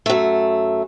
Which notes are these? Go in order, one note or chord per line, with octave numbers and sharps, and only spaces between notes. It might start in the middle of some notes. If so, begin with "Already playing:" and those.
F#2 A3